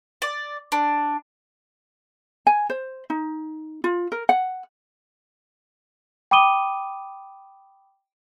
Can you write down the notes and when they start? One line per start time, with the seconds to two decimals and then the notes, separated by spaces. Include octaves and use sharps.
0.22 D5
0.72 D4
2.47 G#5
2.70 C5
3.10 D#4
3.84 F4
4.12 A#4
4.29 F#5
6.31 G5 B5 D6 D#6 D#7 G7